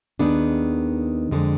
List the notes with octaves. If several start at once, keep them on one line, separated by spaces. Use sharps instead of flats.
D#2 D#3 B3 D4 G#4
F2 D3 G#3